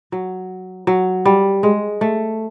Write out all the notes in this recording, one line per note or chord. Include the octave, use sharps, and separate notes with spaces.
F#3
F#3
G3
G#3
A3